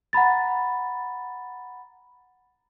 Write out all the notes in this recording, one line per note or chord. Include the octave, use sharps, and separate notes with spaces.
F#5 A#5 B5 A6